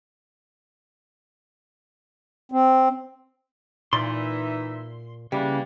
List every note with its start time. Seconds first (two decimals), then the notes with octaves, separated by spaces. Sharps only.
2.52 C4
3.93 A#2 E3 D#4 D5 E5 C6
5.32 C#3 E3 G3 A#3 D4